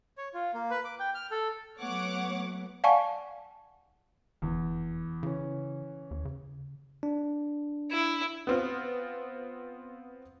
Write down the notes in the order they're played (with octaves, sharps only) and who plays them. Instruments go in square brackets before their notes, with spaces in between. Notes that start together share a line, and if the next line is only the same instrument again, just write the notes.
[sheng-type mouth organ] C#5
F4
A#3
B4
D6
G5
F6
A4
[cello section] F#3 A3 B3 [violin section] C#5 F#5 D6
[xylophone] D5 F5 F#5 G#5 A5 C#6
[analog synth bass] F1 [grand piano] E2
[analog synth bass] C#3 [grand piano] E3 C#4
[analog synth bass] D#2
C#3
[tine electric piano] D4
[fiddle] E4
[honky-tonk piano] B3 C4 F4